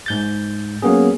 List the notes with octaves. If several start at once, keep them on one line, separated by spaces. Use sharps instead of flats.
G#2 G6 A6
F#3 A#3 B3 C#4 G#4